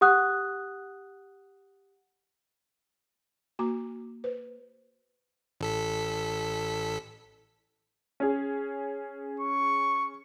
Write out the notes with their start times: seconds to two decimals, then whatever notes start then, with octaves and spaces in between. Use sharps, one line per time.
0.01 G4 F#5 D#6 F#6
3.59 A#3 F#4 A#5 D6
4.24 B4 C5
5.61 A1 A4 B6
8.20 C#4 G#4
9.40 C#6